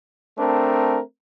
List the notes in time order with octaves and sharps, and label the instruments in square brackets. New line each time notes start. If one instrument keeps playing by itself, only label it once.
[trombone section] A3 C4 D4 A#4